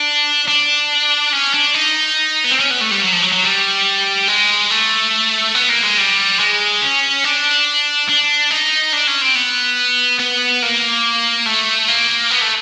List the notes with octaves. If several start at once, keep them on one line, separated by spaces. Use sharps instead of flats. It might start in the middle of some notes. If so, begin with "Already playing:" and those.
Already playing: D4
D4
C#4
D4
D#4
B3
C4
C#4
B3
A3
G3
F#3
F3
F#3
F#3
G3
G#3
A3
B3
A#3
G#3
G3
G#3
C#4
D4
D4
D#4
D4
C#4
C4
B3
B3
A#3
A3
A#3
B3
A3